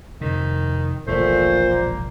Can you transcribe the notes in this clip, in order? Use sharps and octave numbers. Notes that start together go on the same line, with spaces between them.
F2 C3 D#3
E1 A#1 A#2 A3 C5
A#3